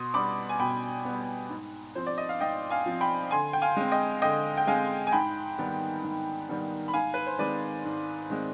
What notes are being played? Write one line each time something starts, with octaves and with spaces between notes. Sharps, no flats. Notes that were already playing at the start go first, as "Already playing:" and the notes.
Already playing: B2 C6 D#6
G3 B3 B5 D6
G#5
B2 G5 B5
G3 B3
G#2
F3 C4 C5
D5
D#5
F5
G#2 D#5 G5
F5 G#5
F3 C4
G5 B5
D3 G#5 C6
G5
F5 G#5
G#3 C4
D#5 G5
D3 D#5 G5
G5
G#3 C4 F5 G#5
G#5
G#2 G5 B5
D#3 G3 B3
G#2
D#3 G3 B3
B5
G#2 F5 G#5
B4
C5
D#3 G#3 C4 B4 D5
G#2
D#3 G#3 C4